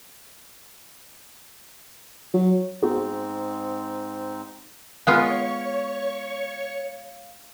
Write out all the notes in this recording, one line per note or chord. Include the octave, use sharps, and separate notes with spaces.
F#3
G#2 B3 C4 D#4 F#4 G#4
G#3 B3 F4 C#5 F5 C#6